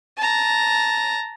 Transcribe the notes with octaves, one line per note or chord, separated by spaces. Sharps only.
A5 A#5